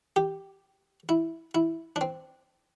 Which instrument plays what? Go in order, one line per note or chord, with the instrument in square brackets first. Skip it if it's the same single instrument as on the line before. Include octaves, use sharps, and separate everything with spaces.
[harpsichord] G4
E4
E4
D4
C4